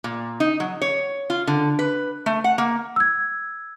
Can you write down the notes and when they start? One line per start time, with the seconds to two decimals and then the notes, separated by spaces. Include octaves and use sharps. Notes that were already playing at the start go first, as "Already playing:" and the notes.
0.04 A#2
0.40 D#4
0.60 F#3
0.82 C#5
1.30 F4
1.47 D3
1.79 B4
2.26 A3
2.44 F#5
2.58 A#3
2.96 E6 G#6